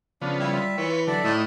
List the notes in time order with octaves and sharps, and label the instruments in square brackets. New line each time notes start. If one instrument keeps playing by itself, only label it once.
[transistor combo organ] C#3 F3 B3 [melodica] D4
[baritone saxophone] G3 [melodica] E4
[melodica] F4 E5
[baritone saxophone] E3 [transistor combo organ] B4 C#5
[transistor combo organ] D3 F#3 [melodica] A4 D5 E5
[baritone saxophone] A2 [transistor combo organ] D#4 E4